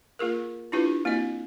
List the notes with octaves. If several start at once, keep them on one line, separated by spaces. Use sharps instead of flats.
A#3 F4 G#4 A#4
D4 E4 F4 G4 B4
A#3 C4 E4 F#4 D#5